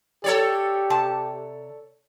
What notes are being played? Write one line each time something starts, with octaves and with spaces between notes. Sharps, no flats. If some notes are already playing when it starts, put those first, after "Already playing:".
G4 A4 C#5 D5
C3 A5